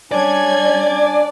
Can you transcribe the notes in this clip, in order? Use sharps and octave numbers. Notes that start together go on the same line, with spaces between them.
G3 C#4 D4 D5 G#5 G#6